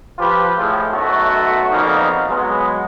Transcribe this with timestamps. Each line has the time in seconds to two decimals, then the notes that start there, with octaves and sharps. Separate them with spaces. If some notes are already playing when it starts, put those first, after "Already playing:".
0.19 F3 F4 G4 B4
0.58 A2 F3 G#3
0.92 B1 F#2 A3 F#4
1.70 F2 A#2 C#3 A#3 B3 D#4
2.29 F#3 G#3 B3